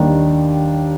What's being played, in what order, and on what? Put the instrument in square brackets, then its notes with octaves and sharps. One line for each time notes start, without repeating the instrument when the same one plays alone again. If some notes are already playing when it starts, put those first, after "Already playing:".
Already playing: [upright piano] D#2 D#3 G3 D4